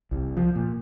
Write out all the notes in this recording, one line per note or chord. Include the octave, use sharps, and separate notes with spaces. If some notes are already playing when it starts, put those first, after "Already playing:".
C2
F3
A#2